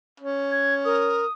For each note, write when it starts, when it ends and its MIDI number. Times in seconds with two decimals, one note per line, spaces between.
0.20 1.24 61
0.51 0.74 92
0.85 1.25 70
0.85 1.33 87